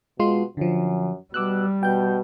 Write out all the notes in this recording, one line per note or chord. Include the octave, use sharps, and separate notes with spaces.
B2 G#3 F4 C6
F#2 D3 F3
B2 G3 D6 E6 F#6
B2 G5 G6